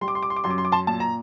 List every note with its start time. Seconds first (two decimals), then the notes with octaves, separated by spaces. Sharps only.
0.01 G3 C6
0.08 D6
0.15 C6
0.23 D6
0.30 C6
0.36 D6
0.44 F#2 C6
0.50 D6
0.58 C6
0.65 D6
0.72 A5 C6
0.87 A#2 A5
1.00 A#5